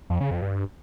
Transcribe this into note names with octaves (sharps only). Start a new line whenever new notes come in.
F2
C#3
F2
G2